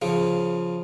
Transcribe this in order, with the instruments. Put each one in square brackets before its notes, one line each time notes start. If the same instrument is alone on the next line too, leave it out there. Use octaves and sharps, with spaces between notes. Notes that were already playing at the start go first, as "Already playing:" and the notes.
[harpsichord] C#3 F3